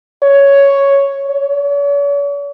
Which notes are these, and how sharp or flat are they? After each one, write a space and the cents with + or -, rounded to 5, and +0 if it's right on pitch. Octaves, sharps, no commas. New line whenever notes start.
C#5 +5
C#5 +45